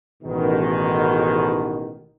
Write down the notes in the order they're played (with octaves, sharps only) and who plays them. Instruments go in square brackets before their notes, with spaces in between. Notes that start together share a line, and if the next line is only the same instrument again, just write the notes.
[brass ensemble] A1 G#2 B2 D#3